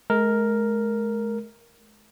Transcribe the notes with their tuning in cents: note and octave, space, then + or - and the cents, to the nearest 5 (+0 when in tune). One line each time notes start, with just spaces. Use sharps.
G#3 +40 A#4 +0